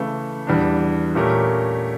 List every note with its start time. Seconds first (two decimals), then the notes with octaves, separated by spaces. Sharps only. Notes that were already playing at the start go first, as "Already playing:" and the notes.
Already playing: C#3 E3 A3
0.47 E2 E3 G3 D4
1.15 A#2 A3 C#4 G4 A#4